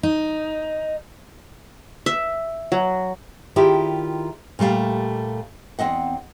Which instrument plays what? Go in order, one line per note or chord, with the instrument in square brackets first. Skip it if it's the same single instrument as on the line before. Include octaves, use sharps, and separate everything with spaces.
[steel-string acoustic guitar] D#4
[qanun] E5
F#3
[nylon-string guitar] D#3 E4 F4 G4 G#4 D5
A#2 G3 A3 F5
E2 C4 D#5 F#5